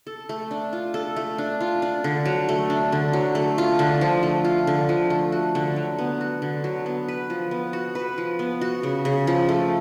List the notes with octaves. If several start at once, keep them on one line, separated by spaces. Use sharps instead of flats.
A4
A3
D4
F4
A4
A3
D4
F4
D4
D3
F#3
A3
D4
D3
F#3
A3
F4
D3
F3
A3
F4
D3
F3
A3
F#4
D3
F#3
B3
F#4
D3
F#3
B3
B4
F3
B3
F#4
B4
F3
B3
F#4
C#3
C#3
F3
A3